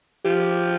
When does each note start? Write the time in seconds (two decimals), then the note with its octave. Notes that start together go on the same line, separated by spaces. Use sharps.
0.25 F3 G4